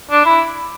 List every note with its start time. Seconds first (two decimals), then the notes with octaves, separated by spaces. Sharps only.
0.11 D4
0.26 E4